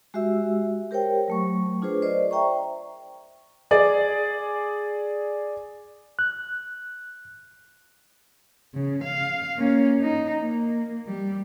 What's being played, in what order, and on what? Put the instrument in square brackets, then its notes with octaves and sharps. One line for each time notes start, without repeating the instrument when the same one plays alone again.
[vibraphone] G#3 F#4 G4 E5 E6
G4 A#4 C5 C#5 G5
F#3 A3 C#6
D4 F4 G#4 B4 C5
A#4 C5 D5 D#5
D5 E5 G5 A#5 C#6
[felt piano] G#4 D5
[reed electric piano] F#6
[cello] C#3
F5
A#3 C#4
D#4
A#3
G3